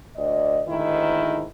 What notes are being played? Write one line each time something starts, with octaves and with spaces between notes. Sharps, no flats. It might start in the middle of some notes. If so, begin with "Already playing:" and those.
D2 D5 D#5
D2 G#2 D#3 E4